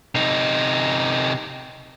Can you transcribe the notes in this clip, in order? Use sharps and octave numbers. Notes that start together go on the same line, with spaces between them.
C3 D#4